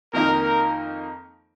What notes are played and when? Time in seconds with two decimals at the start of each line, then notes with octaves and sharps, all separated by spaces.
0.13 F2 D#3 A#3 D#4 A#4
0.42 A#4